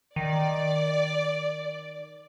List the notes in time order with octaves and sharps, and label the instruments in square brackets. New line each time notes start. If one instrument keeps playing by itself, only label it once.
[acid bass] D#3 [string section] D5